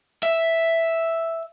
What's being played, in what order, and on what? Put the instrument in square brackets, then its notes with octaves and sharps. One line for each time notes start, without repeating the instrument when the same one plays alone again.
[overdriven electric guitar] E5